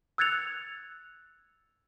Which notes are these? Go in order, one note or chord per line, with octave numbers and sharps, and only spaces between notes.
E6 F#6 G#6 A6 C#7 F7